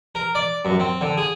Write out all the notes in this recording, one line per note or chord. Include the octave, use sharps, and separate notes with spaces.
A#4
D5
F#2
C4
D3
G#4